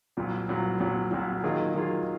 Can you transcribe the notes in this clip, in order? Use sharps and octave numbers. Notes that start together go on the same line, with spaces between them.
C2 A#2 F#3
C2 A#2 F#3
C2 A#2 F#3
C2 A#2 F#3
D#3 F#3 A#3 F4 G#4
D#3 F#3 A#3 F4 G#4